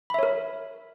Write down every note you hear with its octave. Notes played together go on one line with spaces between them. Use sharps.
A#4 C#5 E5 B5